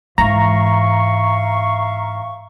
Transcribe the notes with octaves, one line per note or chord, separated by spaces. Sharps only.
G#2 E3 E5 F5 A#5 C#6